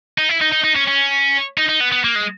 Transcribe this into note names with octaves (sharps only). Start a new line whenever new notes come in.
D#4
E4
D#4
D#4
D#4
C#4
C#4
D#4
D#4
B3
B3
A#3
G#3